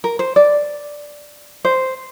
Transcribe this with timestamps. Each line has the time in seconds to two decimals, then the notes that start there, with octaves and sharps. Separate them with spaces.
0.04 A#4
0.19 C5
0.36 D5
1.65 C5